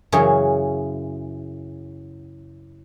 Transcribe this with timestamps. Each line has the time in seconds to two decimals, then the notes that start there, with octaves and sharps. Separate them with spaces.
0.12 F#2 C#3 E3 G#4 C#5